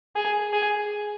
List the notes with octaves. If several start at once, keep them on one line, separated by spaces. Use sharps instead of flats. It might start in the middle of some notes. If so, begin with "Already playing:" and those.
G#4
G#4